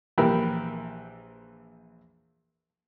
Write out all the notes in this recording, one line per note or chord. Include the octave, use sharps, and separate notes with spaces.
A#1 E3 G4 A#4 B5